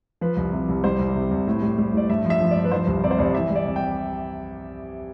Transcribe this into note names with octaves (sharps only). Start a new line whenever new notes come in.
F3 B4
C2
C3
C2
G3 C5
C2
C3
C2
A2
G3
G3
A2 D5
G2 E5
F3
E5
F3
D5
G2
B4
F3 C5
C2
C3 D5
C5
C2 D5
E3 E5
G3
D5
C3
G5